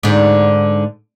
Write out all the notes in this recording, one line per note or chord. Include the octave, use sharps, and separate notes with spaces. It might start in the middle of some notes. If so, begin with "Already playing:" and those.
G#2 D3